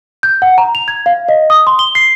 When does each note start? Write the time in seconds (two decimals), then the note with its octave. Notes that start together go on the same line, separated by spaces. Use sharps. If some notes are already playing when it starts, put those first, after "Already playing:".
0.23 G6
0.42 F#5
0.58 A#5
0.75 F7
0.88 G#6
1.06 F5
1.29 D#5
1.50 D#6
1.67 C6
1.79 G7
1.95 C7